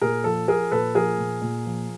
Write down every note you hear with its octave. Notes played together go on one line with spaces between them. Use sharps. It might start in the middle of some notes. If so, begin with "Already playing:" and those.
A#2 G#4 A#4
F3 A4
F3 G#4 A#4
A#2 A4 B4
F3 G#4 A#4
A#2
A#2
F3